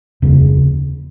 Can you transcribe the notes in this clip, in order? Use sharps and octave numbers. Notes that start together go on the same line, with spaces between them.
F1 D#2 C#3